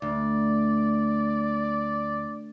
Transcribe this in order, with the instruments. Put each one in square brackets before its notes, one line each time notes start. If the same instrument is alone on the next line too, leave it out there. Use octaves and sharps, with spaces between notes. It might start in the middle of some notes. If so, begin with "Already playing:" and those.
[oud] D2 [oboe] D5